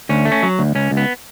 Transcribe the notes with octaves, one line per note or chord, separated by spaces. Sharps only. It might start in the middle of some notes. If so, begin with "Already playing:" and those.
D2 C#4
A3
C#4
F#3
D2
C#2 C#4
C#2
B3